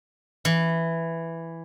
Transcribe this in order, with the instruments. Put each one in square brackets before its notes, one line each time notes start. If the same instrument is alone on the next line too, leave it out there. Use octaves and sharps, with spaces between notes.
[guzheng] E3